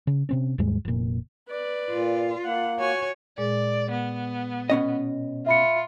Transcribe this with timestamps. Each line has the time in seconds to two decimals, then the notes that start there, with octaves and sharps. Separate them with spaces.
0.07 C#3
0.29 C3 C4 C#4
0.58 D#2 G#2 G3 G#3
0.85 F1 A#2
1.48 B4 D5
1.90 A#2 F4
2.44 A#3 F#5
2.79 F#4 C#5 G#5
3.38 A#2 G#3 G#4 D5
3.91 B3
4.70 B2 C#4 D#5
5.46 F4 E5 B5 C#7